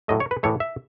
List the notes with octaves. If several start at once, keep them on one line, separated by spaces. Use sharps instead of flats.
A2 F#3 A3 D#5
C#5
B4
A2 E3 A3 C#5
E5